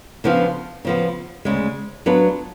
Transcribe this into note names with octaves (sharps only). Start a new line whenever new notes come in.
C#3 F3 B3 D4 F4
C#3 F3 B3
D2 C#3 G#3
F#3 B3 D4 F4 B4